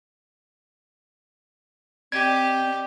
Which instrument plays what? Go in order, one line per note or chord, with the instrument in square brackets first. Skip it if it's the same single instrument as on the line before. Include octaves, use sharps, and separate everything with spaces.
[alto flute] C4 [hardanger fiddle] G4 [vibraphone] D5 D#5 [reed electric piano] G#6